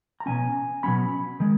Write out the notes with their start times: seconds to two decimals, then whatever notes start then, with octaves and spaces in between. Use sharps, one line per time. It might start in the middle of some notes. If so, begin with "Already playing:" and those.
0.20 A#5
0.26 B2 F#3 C#4 G#5
0.83 B2 F#3 C#4 B5
1.40 D#3 G#3